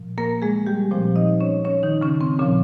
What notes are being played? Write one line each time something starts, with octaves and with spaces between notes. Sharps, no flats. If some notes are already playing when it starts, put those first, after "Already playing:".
Already playing: A#2 F3
A#3 A#4
G#3 G#4
G3 G4
A#2 F3 C4 C5
D#4 D#5
C#4 C#5
C#4 C#5
D#3 D#4
C#3 C#4
C4
A#2 C#3 F3 C#4